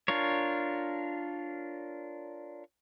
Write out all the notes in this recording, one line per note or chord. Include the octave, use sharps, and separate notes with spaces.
D4 F4 A#4 C#5